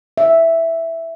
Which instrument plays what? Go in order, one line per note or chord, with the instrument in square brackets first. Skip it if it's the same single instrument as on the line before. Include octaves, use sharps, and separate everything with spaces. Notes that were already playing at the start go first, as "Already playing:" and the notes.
[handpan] E5